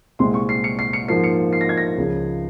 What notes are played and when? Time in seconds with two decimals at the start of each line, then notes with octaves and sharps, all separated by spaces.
0.19 C2 A#2 G#3 C4 C6
0.34 C#6
0.49 C7
0.64 C#7
0.79 C7
0.93 C#7
1.08 G#2 F3 A#3 C7
1.24 C#7
1.53 C7
1.61 A#6
1.69 G#6
1.77 A#6
1.98 C#2 C#3 F3